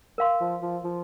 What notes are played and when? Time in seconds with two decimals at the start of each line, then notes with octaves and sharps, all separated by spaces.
0.18 A#4 F5 C6
0.41 F3
0.62 F3
0.84 F3